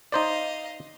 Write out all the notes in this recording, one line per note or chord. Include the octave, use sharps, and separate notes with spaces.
D#4 C5 D5 D#5 F5